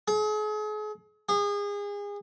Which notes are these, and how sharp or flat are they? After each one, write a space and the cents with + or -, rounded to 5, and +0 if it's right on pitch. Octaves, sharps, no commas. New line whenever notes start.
G#4 +40
G#4 -30